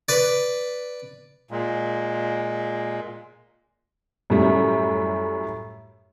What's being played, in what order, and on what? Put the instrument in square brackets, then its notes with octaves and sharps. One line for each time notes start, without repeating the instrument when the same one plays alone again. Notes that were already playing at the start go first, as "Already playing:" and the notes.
[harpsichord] B4 D5
[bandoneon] A#2 G#3
[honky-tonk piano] F#2 A2 G3